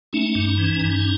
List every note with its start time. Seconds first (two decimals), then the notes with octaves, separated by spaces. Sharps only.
0.13 A3 C#4 D#4
0.35 G2
0.58 E3
0.81 G2